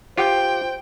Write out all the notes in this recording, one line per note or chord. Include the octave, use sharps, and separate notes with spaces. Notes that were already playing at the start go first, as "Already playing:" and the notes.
F4 G4 C5 G5